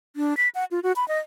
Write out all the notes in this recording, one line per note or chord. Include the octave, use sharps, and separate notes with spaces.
D4
B6
F#5
F4
F#4
B5
D#5